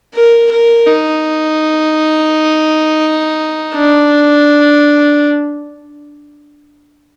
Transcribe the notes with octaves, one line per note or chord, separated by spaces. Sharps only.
A#4
A#4
D#4
D4